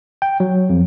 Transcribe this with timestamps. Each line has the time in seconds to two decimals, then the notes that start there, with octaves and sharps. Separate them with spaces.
0.22 G5
0.40 F#3
0.69 F2